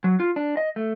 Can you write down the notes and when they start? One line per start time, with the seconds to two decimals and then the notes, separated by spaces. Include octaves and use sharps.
0.04 F#3
0.20 F4
0.36 D4
0.57 D#5
0.76 A3